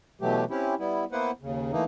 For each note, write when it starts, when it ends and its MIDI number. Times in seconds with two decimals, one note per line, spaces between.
0.21 0.44 47
0.21 0.44 52
0.21 0.44 54
0.21 0.44 57
0.21 0.44 67
0.50 0.75 60
0.50 0.75 61
0.50 0.75 64
0.50 0.75 67
0.79 1.05 55
0.79 1.05 59
0.79 1.05 64
1.12 1.31 58
1.12 1.31 59
1.12 1.31 64
1.12 1.31 71
1.12 1.31 72
1.12 1.31 78
1.42 1.72 39
1.42 1.72 49
1.72 1.84 52
1.72 1.84 57
1.72 1.84 58
1.72 1.84 63